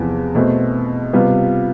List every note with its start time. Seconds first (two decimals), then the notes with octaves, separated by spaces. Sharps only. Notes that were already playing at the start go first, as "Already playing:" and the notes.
Already playing: E2 C3 F3 B3
0.35 B2 A3 C4
1.13 C3 G3 B3 F4